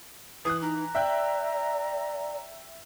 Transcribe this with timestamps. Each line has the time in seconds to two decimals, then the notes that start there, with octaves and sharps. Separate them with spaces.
0.45 E3 D#6 F#6
0.62 D#4 A#5
0.95 D5 E5 G5 F#6